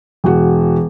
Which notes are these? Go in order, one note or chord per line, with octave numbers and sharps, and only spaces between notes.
E1 F#4